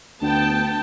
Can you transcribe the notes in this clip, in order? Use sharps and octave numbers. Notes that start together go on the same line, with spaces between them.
D2 B3 G5 A5